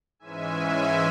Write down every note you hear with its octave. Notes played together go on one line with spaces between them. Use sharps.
G#2 E3 G#3 C#4 E5 G#5